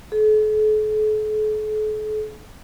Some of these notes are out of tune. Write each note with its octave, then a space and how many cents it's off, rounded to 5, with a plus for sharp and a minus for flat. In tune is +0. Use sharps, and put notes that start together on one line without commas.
A4 -45